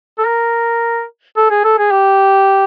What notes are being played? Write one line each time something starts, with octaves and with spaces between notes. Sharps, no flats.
A4
A#4
A4
G#4
A4
G#4
G4